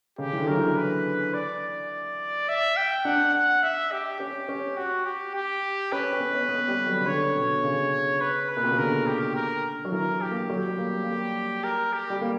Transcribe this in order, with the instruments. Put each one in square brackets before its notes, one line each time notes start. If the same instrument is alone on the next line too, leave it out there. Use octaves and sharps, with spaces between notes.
[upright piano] C#3 [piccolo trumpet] G4
[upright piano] E3
D3
[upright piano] F#3 [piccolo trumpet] A#4
[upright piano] E3
[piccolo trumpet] B4
D5
E5
G5
[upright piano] D4 [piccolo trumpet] F#5
[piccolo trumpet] F#5
E5
G4
[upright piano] C#4 [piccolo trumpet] G4
[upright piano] C#4
[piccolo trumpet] F#4
G4
G4
[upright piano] C#4 [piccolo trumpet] B4
[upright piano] C#4
B3
C#4
B3
G3
F#3
C#3
[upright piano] D3 [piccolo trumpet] C#5
[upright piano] B2
C#3
[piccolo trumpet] B4
B4
[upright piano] A#2
B2
C#3
[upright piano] D3 [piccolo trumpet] A#4
[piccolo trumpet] G4
A#4
[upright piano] F#3
[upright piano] E3 [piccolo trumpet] A#4
[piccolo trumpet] G4
[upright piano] A#3
F#3
G3
A#3
A#3
G3
[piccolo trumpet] A#4
G4
[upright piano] G3
A#3